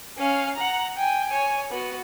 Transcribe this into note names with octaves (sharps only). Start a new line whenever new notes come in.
C#4 F5
F#5 A#5
G5 G#5
C#5 G#5
B3 F#4